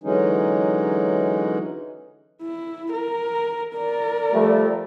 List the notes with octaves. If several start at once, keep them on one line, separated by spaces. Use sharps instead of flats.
D3 E3 F#3 G#3 C#4 D#4
E4
A#4
A#4 D5
F3 G3 A3